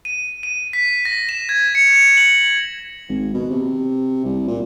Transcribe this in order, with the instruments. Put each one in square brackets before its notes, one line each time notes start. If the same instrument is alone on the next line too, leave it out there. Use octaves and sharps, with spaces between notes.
[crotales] D#7
D#7
B6
A#6
E7
G#6
C#7
C#7
F#7
[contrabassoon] G#1
B2
C3
C2
A#2